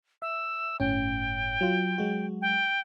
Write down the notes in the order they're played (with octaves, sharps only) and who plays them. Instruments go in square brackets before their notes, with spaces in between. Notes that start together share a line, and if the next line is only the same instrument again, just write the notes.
[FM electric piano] E5 [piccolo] E6
[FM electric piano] G1 A2 C#4 [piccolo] G5
[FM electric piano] F#3 F4
F#3 G#3 F#4
[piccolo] G5